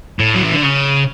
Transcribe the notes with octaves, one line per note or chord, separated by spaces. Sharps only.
A2
F#3
E3
D3
C#3